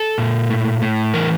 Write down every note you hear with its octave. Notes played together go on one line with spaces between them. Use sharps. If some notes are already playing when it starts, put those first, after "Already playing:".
Already playing: A4
A#2
A2
A2
E3 A#4